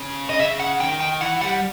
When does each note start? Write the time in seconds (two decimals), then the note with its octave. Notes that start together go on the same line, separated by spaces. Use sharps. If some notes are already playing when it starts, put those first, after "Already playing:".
Already playing: C#3
0.30 D#5
0.39 C#3 E5
0.60 F#5
0.80 D#3 G5
1.00 G5
1.21 E3 F#5
1.41 G3 F#5